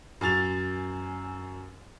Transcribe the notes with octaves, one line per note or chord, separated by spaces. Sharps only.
F#2 G#5 A6 F7